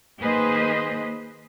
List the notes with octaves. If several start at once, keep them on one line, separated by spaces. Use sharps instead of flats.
D#3 A#3 G#4 B4 C5 D#5